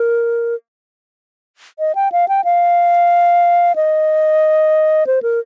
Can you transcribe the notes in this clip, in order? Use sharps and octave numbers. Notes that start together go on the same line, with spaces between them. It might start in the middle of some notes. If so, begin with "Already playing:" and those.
Already playing: A#4
D#5
G5
F5
G5
F5
D#5
C5
A#4